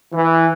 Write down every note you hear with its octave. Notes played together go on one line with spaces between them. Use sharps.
E3